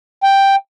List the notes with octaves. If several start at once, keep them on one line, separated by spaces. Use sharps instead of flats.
G5